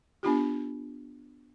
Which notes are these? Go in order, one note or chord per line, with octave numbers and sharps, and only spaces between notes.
B3 D4 F4 G4